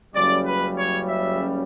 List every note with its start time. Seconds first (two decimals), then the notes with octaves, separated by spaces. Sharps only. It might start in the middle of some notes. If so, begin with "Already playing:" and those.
0.14 F#1 F#2 C#3 G3 D5
0.45 B4
0.76 C#5
1.07 E5